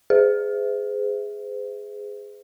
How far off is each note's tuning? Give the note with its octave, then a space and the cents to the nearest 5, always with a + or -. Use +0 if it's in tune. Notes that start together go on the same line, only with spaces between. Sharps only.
G#4 +0 C5 -45 E5 -5